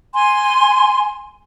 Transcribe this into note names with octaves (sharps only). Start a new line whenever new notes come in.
G#5 C6